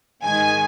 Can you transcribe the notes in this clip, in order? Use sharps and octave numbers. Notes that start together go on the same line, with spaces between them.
G#2 D#3 G#3 G#5